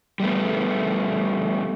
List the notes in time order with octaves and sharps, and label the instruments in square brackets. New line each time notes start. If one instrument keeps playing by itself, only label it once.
[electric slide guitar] G3 A3 B3